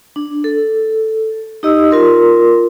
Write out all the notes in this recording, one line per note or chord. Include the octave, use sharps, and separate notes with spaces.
D4
A4
D#4 G4 D#5 E6
F4 A#4 C6